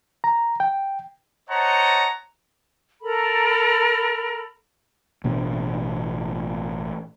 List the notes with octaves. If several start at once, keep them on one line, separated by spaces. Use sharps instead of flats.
A#5
G5
C5 C#5 D#5 F#5 A5 A#5
A4 A#4 A#5 B5
A1 B2 A#3 D4